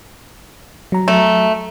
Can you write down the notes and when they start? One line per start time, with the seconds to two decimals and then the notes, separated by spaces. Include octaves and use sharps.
0.92 F#3 A#5
1.08 A3